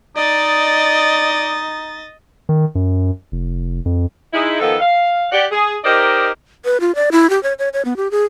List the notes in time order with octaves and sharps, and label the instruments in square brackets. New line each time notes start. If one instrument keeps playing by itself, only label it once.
[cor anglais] D#4 [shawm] D5 [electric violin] D#5 A6
[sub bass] D#3
F#2
F1
F2
[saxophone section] G#3 D#4 E4
D#3 F3 B3 A4
F5
G4 D5 F#5
G#4
D#4 G4 A#4 C5 D5 D#5
[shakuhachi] B4
F4
D5
E4
G4
C#5
C#5
C#5
B3
G4
G#4